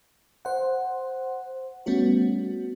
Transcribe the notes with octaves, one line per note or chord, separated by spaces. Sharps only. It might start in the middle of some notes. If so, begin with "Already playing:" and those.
C5 F#5
G3 A3 B3 C#4 F#4